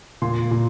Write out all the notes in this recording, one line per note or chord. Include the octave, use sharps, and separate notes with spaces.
A#2 C6
A#2